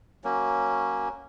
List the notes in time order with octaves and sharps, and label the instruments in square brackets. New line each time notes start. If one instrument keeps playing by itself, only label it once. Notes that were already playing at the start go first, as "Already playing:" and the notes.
[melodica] F#3 A#3 C#4